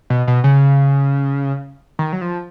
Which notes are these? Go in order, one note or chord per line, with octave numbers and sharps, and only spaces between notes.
B2
B2
C#3
D#3
F#3
F3